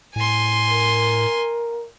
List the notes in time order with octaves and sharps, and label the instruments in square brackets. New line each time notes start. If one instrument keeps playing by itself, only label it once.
[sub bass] A2 [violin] G#5 C6
[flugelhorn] A#4